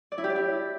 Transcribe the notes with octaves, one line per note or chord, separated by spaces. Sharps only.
D5
E4
G4
D5
E4